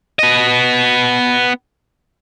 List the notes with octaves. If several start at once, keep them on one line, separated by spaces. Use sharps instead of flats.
B3 D#5